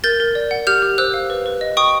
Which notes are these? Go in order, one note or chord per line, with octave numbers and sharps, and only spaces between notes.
A#4 G6 A6
A#4
D5
F#5
G4 F6 G6
G4
C5 E6 F#6
F5
B4
B4
D#5
G5 C#6 D#6